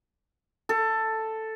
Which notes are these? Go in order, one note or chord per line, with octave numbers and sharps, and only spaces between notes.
A4